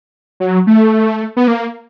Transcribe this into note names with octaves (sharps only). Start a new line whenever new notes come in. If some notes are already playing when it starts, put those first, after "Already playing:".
F#3
A3
B3
A#3